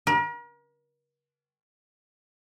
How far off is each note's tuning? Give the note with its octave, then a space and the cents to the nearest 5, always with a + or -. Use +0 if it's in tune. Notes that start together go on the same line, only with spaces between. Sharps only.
A#4 +40